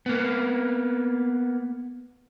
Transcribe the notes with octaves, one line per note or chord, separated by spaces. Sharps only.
A#3 B3